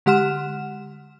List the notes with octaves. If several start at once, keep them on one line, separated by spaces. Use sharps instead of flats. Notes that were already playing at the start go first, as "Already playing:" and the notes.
D3 G#3 G4 F#5 F6 E7